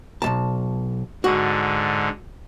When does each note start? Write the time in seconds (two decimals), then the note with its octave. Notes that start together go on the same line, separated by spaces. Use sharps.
0.22 B1 E2 A5
1.24 G#2 D3 F#4